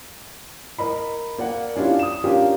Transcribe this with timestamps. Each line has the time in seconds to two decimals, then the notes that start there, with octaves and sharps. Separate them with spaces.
0.79 A#4 D#5 B5
1.38 A#3 D5 F5 F#5
1.76 C#4 D4 E4 F4 G4
1.99 D#6 E7
2.24 C#4 D4 F4 G4 A#4